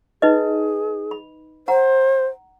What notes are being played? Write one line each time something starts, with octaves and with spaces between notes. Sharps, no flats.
D#4 G#4 B4 D#5
B5
C5 F#5 A#5